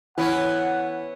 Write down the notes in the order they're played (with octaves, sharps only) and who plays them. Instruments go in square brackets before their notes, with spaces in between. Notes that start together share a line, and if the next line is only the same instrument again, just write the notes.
[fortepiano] E3 [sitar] B3 C#4 E4 [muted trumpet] F#5